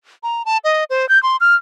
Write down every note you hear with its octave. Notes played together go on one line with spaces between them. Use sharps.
A#5
A5
D#5
C5
G6
C6
F6